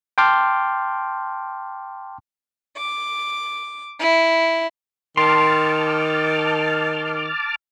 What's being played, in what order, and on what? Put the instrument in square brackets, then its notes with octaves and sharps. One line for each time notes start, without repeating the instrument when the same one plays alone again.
[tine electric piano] G5 A5 C6 D6 F6
[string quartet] D6
E4
[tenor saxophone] D#3 [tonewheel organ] A5 D6 F6 [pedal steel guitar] C6